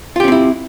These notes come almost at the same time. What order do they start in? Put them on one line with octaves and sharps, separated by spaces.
F4 G4 C#4 C4 E4